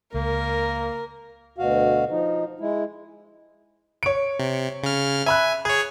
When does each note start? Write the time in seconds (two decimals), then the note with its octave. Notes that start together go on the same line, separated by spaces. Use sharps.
0.14 C#2 A#3 A#4
1.58 D2 B2 F#4 F5
2.10 F3 D#4
2.60 G#3 E4
4.03 C#5 D7
4.39 C3
4.83 C#3 F6
5.26 E5 G#5 B5 F#6
5.65 G#4 C#5 G#6